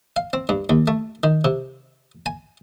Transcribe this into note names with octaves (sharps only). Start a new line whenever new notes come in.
F5
C4
G2
D#2
A3
D#3
C3
G#5